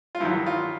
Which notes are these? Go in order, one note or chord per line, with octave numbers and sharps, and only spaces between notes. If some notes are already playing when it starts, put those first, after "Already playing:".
F4
G2 D#3 F#3 E4
F4